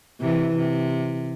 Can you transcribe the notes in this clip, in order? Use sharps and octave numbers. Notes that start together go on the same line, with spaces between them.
C3 E3
C3